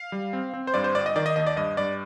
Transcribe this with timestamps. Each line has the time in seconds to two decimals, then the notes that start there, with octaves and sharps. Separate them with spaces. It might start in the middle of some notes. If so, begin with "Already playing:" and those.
Already playing: F5
0.12 G3
0.33 C4
0.54 C4
0.67 C5
0.74 G2 D5
0.84 C5
0.95 G1 D5
1.06 D#5
1.16 D#3 D5
1.26 D#5
1.36 D#2 D#5
1.47 D5
1.56 G2 D#5
1.77 G2 D5